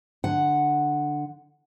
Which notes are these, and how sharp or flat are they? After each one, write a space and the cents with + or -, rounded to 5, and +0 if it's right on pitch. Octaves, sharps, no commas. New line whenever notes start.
D3 +10 F#5 +0